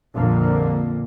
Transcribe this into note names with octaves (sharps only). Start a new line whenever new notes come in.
A#1 F2 A#2 D3 A#3